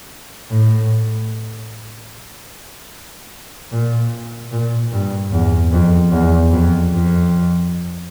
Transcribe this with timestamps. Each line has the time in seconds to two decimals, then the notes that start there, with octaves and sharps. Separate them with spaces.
0.50 A2
3.71 A#2
4.52 A#2
4.92 G2
5.32 E2
5.72 F2
6.12 E2
6.52 F2
6.92 F2